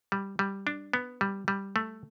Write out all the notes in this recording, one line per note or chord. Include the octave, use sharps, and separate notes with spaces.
G3
G3
D4
B3
G3
G3
A3